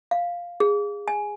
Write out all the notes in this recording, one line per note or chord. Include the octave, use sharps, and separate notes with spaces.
F5
G#4
G#5